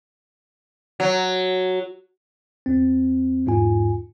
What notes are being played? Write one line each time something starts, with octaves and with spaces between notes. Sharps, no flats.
F#3
E2 C4
E2 G#2 F4 G#5